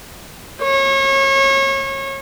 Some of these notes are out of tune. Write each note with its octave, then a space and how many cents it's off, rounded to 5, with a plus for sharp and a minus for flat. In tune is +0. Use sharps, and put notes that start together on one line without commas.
C#5 -30